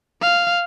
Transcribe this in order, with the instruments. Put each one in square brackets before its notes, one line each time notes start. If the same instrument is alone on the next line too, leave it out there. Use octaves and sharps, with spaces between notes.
[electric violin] F5